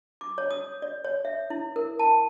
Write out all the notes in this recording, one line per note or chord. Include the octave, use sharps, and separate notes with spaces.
D6
C#5
D#6
D5
C#5
E5
E4
A#4
A5